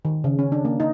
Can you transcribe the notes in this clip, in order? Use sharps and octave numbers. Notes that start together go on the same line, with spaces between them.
D#3
C#3
C#4
D4
A#3
D#4